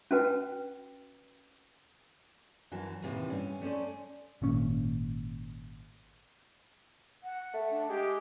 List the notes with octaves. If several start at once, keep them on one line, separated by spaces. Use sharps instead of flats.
C#4 F#4 B4 G5
F#2 E3 F#4 A5
D#2 A2 C3 E3
G2 C#4
A3 C#4 C5 D5
G#1 A#2 C#4
F#5
A3
D4
G#3 G4